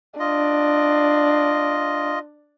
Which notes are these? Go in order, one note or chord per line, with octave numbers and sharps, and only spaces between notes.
D4 F4 D#5